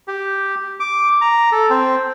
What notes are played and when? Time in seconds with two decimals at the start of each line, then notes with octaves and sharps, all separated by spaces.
0.08 G4
0.80 D6
1.21 A#5
1.52 A4
1.70 C4